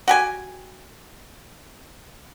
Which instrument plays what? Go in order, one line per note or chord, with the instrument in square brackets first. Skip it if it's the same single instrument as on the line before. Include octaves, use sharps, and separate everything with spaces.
[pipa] F#4 G4 G#5